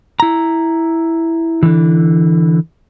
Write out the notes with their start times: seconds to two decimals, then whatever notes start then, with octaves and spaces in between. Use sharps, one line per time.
0.20 E4 A#5
1.63 D3 E3